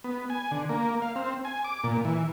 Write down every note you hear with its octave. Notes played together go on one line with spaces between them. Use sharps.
B3
G#5
D3
A#3
F5
C4
G#5
D6
A#2
E3